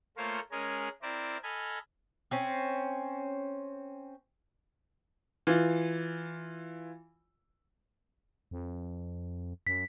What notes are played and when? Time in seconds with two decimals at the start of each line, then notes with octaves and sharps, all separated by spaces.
0.17 A3 A#3 F4 A#4 C5 C#5
0.51 G#3 C#4 G#4 A#4
1.02 C4 E4 A#4 C5 D5
1.43 A4 D#5 G#5 B5 F6
2.31 C4 C#4
5.47 E3 F4
8.51 F2
9.67 F#2 B6